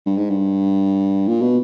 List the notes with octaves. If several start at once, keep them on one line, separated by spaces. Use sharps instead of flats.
G2
G#2
G2
A#2
B2